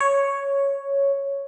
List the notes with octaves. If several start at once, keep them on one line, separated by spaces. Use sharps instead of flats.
C#5